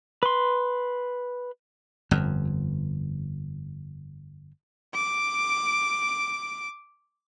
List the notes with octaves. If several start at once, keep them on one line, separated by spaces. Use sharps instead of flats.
B4 C6
G1 F2
D6 D7